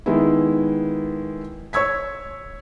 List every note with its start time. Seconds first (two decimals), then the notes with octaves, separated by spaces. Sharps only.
0.06 D#3 G#3 B3 E4
1.73 C#5 C#6 E6 G#6 B6